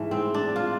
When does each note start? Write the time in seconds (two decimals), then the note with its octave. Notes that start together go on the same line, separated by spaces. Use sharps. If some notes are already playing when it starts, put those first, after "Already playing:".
Already playing: G#2 E3 A3
0.11 C4
0.34 D4
0.56 F4